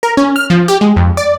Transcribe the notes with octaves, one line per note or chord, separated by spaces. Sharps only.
A#4
C#4
F6
F3
G4
G#3
F2
D5